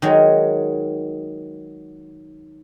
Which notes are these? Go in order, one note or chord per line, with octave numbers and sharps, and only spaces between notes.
D#3 F#3 G#3